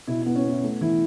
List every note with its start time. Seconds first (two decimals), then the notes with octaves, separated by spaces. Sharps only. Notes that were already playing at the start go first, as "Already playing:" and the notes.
0.07 B2 E4
0.21 E4
0.26 B3
0.35 C#4
0.44 B3 E4
0.63 A3
0.81 E3 E4